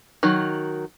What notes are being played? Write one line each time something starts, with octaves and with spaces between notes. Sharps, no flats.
D#3 F#3